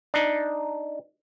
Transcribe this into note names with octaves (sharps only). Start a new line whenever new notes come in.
D4 D#4